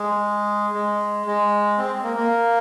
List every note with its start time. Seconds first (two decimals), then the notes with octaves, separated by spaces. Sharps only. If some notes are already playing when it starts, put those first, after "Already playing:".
Already playing: G#3
0.74 G#3
1.27 G#3
1.78 C4
2.04 A#3
2.16 A#3